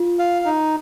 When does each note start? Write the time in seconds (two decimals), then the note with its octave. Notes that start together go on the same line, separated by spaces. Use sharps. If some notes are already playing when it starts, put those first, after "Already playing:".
Already playing: F4
0.19 F5
0.45 D#4